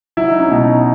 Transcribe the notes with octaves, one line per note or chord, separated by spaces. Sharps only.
F#3 E4
D#4
C#4
B2 E4
D#4